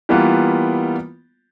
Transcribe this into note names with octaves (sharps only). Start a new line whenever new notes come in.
E3 G3 A#3 B3 F4